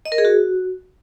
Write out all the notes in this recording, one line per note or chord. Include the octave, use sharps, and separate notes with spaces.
D#5
A#4
G#4
F#4